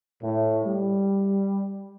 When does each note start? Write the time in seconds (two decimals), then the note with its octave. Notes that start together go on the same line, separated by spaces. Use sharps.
0.22 A2
0.64 G3